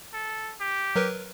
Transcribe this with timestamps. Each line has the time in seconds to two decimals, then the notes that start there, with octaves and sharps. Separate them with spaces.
0.13 A4
0.61 G4
0.96 F#3 A#4 B4